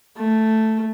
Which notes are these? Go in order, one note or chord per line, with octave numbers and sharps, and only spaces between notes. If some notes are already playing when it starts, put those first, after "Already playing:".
A3